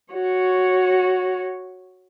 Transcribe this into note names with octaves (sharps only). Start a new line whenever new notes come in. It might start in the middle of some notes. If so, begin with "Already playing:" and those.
F#4 C#5